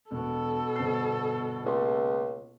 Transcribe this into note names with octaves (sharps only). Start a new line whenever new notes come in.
E1 B2 A4
G1 C5 C7
C#2 A#3 C6